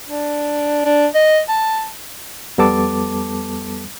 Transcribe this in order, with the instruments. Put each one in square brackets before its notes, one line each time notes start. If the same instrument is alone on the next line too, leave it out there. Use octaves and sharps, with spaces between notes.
[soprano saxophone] D4
D4
D#5
A5
[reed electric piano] F2 G3 B3 A4 A5 D6